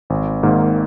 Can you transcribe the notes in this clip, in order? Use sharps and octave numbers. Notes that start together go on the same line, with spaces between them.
G#1
G#2 D#3 A#3